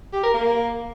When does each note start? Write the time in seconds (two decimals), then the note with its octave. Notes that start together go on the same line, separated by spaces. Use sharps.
0.13 G4
0.23 A#4
0.34 A#3